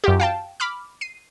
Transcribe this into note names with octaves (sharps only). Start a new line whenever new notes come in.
F#2 F4 G4
F5 G5 A5
B5 D6 F6
C7 D#7